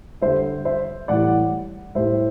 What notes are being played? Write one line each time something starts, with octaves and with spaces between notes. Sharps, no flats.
D3 G3 C5 E5
C5 E5
A2 E3 G3 D5 F#5
A2 G3 C5 E5